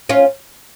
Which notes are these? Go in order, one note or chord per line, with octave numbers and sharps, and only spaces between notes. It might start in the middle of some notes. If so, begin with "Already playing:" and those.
C#4 F4